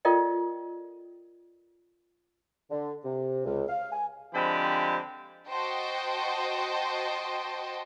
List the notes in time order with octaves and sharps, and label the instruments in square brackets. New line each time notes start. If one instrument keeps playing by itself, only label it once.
[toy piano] F4 A4 A#4 D5 D#5 G5
[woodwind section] D3
C3
C#2
F5
G#5
[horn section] D3 F3 G#3 C4 G4 B5
[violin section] F#4 C5 D#5 G5 A5